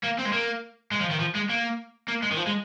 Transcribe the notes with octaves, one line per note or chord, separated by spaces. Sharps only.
A#3
C4
G#3
A#3
G#3
F3
D#3
F3
G#3
A#3
A#3
G#3
D#3
F3
G#3